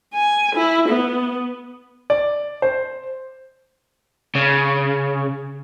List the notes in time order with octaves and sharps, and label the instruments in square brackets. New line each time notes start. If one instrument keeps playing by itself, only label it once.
[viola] G#5
E4
B3
[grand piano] D5
C5
[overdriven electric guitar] C#3